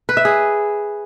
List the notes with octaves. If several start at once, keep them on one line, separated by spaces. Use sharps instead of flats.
B4
E5
G#4